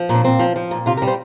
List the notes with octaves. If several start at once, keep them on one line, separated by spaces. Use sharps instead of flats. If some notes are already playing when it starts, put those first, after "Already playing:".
Already playing: F3
A#2
D4
A#2 C4
F3
F3
A#2
C3 F4
A#4
G3
C5